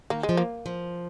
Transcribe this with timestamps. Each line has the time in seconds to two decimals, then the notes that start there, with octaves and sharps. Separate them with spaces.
0.10 D#3 A#3
0.23 G#3
0.29 F3
0.37 A#3
0.66 F3